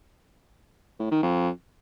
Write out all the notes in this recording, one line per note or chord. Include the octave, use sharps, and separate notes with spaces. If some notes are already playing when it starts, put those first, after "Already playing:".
A2
D#3
F2